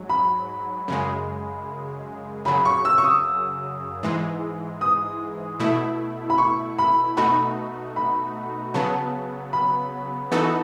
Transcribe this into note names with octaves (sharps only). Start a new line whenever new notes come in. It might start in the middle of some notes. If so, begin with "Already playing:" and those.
Already playing: G#2 F#3
B5
F#2 C#3 G#3
F#2 C#3 F#3 B5
C#6
E6
C#6
D#6
G#2 E3 G#3
D#6
B2 A3 E4
B5
C#6
B5
B2 A3 D#4 F#4 B5
B5
C#3 F#3 B3 A5
B5
E3 B3 D#4 F#4 A4